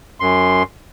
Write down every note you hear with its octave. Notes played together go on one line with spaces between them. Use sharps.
F#2 C6